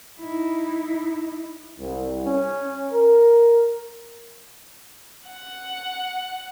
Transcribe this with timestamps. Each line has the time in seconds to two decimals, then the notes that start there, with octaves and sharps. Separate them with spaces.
0.19 D#4 E4
1.79 C2
2.25 C#4
2.91 A#4
5.29 F#5